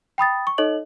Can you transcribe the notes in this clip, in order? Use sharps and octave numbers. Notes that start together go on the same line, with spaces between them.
G5 B5 D#6 A6
C#6
D#4 A4 C#5 D#5 F#7